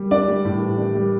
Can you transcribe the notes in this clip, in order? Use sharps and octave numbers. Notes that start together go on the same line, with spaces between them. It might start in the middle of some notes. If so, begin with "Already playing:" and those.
Already playing: G3
D4 D5
G3
A2
E3
D4
G3